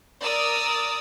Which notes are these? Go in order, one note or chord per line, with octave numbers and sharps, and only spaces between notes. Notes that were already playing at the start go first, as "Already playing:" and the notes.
A#4 D5 D#6 E6